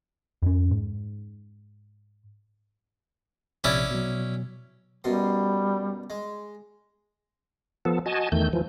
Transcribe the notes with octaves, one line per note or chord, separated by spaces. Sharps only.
F2 C#4
G#2
A#1 C3 C#4 E4 D5
B2 F#3
F#2 B2 G3 C6
G#3
F3 B3 A4
F#4 D#5 G#5 A5
E2 D#3 A3 G6
E3 F3